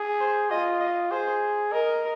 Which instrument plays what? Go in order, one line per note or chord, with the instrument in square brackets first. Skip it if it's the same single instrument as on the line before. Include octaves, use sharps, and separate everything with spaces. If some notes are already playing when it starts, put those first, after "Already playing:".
Already playing: [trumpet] G#4
[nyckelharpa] C5
[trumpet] F4 [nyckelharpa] D#5
[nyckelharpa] D#5
[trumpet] G#4 [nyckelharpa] C5
[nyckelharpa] A#4 [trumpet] D#5